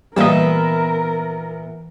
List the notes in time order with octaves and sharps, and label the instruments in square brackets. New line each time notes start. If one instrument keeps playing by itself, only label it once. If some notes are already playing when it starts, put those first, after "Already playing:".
[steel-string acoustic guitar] A#2 B3 E5 [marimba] E3 [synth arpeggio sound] G3 A#3 D#5 [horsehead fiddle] A#4